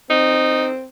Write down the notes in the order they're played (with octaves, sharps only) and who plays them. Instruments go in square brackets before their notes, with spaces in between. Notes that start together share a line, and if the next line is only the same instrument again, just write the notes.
[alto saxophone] C4 [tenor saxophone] D#4